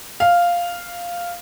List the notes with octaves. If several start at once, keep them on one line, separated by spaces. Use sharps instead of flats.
F5